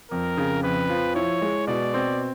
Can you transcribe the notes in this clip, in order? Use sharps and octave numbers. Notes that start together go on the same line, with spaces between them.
F2 A#4
C#3
F2 B4
F3
E4 C#5
G#3
B2 D5
C4